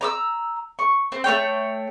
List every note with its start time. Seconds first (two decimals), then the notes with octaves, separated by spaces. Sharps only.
0.01 A#5 D6 E6
0.79 C#6
1.12 C4
1.24 A3 C4 C#5 G5